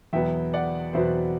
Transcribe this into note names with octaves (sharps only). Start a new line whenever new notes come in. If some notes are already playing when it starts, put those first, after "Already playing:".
E2 B2 F#3 B3 E5 G5
D5 F#5
E2 B2 F#3 B3 C5 E5